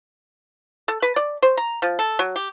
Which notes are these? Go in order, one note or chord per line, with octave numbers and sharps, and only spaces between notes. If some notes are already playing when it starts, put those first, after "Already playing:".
A4
B4
D5
C5
A#5
F3
A4
F#3
G4